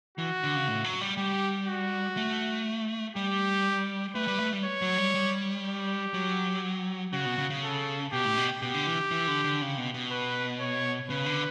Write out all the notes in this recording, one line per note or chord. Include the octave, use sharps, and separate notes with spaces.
E3 F#4
D3
C#3
A2
F#3
G3
G3 G4
F#4
A3
G3 G4
A3 B4
G3
A3
G3
C#5
F#3
G3
G3
G4
F#3
C#3 F#4
B2
C#3
C#3
A4
B2 G4
A2
B2
B2 G4
D3
E3
E3
D3
D3
C#3
B2
B2
B4
C#5
C#3 B4
D3